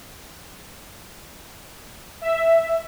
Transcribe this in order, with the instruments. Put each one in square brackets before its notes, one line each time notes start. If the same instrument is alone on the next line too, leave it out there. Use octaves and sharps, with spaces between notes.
[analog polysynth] E5